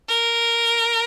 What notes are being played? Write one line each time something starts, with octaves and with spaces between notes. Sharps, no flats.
A#4